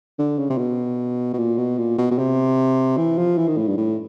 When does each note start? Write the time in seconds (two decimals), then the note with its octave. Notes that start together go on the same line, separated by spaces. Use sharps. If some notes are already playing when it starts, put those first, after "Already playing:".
0.19 D3
0.38 C#3
0.50 C3
0.58 B2
1.33 B2
1.38 A#2
1.58 B2
1.78 A#2
1.98 B2
2.11 B2
2.18 C3
2.97 E3
3.18 F3
3.38 E3
3.48 D#3
3.57 A2
3.68 G2
3.77 A2